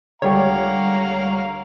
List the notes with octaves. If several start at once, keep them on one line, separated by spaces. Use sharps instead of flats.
C#2 D3 G3 G4 C#5 F5 F#5 A#5